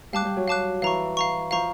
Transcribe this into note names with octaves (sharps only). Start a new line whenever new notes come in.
G3 F5 A5 D6 F#6
G3
F#3
F5 A5 D6 F#6
E3 F5 A#5 C#6
F5 A#5 C#6
F3 F5 A#5 C#6